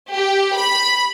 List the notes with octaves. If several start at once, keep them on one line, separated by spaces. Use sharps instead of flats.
G4
B5